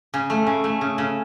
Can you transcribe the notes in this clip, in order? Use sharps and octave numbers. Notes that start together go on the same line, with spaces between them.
C#3
A3
C#3
A3
C#3
C#3